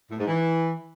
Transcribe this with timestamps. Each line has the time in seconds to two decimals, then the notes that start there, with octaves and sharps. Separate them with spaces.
0.10 A2
0.19 G#2
0.28 E3